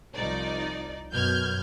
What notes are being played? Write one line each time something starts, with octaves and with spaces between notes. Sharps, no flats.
C2 F3 D#4 D5
F#2 B2 F6 G6 G#6